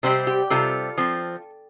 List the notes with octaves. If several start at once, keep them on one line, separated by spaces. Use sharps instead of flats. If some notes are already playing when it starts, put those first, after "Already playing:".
C3 G3 C4 G4 C5
G4
C3 G3 C4 F4 A4
F3 C4